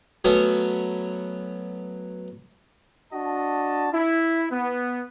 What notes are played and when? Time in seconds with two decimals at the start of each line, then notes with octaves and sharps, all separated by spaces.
0.25 F#3 A3 B3 C#4
3.13 D4 F#4 D#5 A5
3.93 E4
4.51 B3